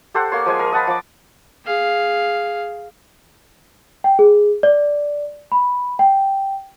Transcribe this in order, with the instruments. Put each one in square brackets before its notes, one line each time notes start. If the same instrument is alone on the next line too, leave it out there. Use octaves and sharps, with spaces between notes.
[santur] G4 A4 C5 F#5
A#3 C#5 C6
F3 G#3 G#5
A#4
D#5 F#5 A5 B5
F3 D6
[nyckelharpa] G#4 F5
[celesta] G5
G#4
D5
B5
G5